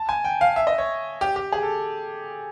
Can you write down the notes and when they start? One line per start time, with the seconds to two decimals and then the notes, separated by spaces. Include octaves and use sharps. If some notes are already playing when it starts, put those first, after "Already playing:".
Already playing: A5
0.09 G#5
0.24 G5
0.41 F5
0.56 E5
0.67 D#5
0.78 C#5
1.21 G4
1.36 G4
1.52 G#4
1.63 A4